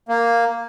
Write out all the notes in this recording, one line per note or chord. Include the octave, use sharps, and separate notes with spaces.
A#3